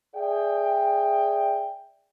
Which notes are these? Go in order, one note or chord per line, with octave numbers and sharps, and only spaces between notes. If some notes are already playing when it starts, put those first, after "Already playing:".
G#4 D5 E5 G5